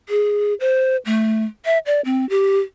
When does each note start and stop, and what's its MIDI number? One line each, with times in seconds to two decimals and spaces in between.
0.09 0.54 68
0.60 0.97 72
1.05 1.45 57
1.65 1.78 76
1.86 2.01 74
2.05 2.28 60
2.29 2.59 67